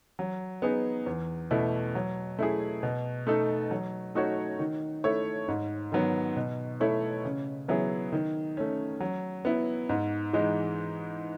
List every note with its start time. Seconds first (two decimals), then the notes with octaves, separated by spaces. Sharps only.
0.19 F#3
0.62 B3 D#4 G#4 B4
1.06 E2
1.51 B2 A3 E4
1.95 F#3
2.39 A3 E4 G#4
2.83 B2
3.27 A3 D#4 A4
3.71 F#3
4.15 A3 D#4 F#4 C#5
4.59 D#3
5.04 A3 E4 A4 C#5
5.48 G#2
5.92 D#3 F#3 B3
6.36 B2
6.80 A3 E4 A4 C#5
7.25 C#3
7.68 F#3 B3 E4 G#4
8.12 D#3
8.57 A3 C#4
9.00 F#3
9.45 B3 E4
9.89 G#2
10.33 E3 G#3 D#4